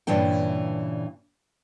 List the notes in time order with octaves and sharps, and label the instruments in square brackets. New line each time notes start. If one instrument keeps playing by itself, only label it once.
[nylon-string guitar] G2 A#2 C#3 E3 D4 G5